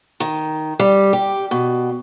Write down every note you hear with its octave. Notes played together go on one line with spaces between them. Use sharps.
D#3
G3
G4
B2